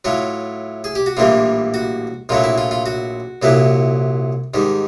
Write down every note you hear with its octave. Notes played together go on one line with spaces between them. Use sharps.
A2 F#3 A3 F4
G#4
G4
F#4
A#1 A2 E3 G3 A#3 F4
F#4
A#1 A#2 F#3 A3 F4
E4
F4
F4
F#4
C2 A#2 F#3 B3 E4
G#2 D#3 G3